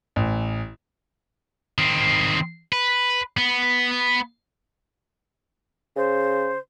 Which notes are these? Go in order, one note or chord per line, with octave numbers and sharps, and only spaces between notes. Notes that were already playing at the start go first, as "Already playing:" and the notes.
A1
D#3 C4
B4
B3
C#3 C5